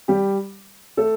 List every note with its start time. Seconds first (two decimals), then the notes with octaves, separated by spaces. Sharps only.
0.08 G3 G4
0.97 A3 A4